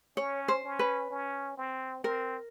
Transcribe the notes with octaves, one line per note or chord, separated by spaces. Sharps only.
C#4 C#5
C5
C#4
B4
C#4
C4
C4 A#4